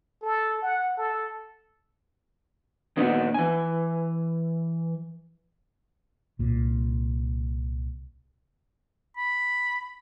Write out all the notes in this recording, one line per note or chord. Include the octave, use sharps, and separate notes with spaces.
A4
F#5
A4
D#2 A#2 B3 D4 D#4 F#4
E3 G#5
C2 A#2
B5